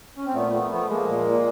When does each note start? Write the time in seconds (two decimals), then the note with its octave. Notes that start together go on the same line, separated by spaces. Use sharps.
0.17 C#4
0.26 C4
0.34 A#2 A3 B3
0.52 F3 A3 B3
0.70 F3 A3 B3
0.88 F3 G#3 A#3
1.07 A#2
1.25 A#2